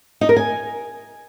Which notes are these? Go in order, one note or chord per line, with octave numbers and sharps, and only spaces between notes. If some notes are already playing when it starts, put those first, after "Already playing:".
D#4
A#4
G#5